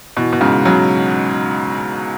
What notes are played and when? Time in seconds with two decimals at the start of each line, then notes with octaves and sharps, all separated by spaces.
0.17 B2 E3
0.33 B2
0.41 G#2 C#3
0.65 C#3 F#3